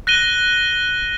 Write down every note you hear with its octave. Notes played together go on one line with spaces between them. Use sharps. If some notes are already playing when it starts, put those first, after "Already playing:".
F#6 A#6 D#7 G7